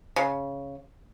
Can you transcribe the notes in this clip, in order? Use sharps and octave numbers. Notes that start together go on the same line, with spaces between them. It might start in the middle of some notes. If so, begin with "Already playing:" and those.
C#3